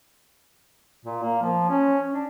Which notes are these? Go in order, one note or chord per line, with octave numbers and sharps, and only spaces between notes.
A#2
A#3
F3
C#4
D4